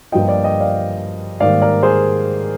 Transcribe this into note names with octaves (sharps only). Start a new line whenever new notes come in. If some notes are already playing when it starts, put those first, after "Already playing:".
G2 F3 A#3 F4 D#5 G5
D5 F5
D#5 G5
D5 F5
G#2 D#3 G3 A#3 D5 F5
A#4 D5
G#4 C5